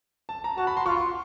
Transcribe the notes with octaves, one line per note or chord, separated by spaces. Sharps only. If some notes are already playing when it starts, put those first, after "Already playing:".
A5
A#5
F#4 A5
B5
C6
F4 C#6
C6